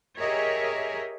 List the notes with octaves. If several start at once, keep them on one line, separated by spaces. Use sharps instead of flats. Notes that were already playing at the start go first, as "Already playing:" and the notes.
G4 G#4 A#4 C#5 D#5 E5